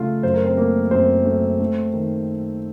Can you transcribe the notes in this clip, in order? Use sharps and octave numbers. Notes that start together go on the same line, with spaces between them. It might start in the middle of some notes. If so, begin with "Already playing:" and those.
Already playing: C#3 A3 F4 F5
F#2 C5
A#4
C4 C5
A3 A#3 A#4
F#2 C4 C5
A3
A3
D#3